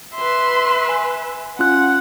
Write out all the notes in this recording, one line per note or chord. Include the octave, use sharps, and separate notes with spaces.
B4 E5 C6
G#5
C#4 F4 F#5 F#6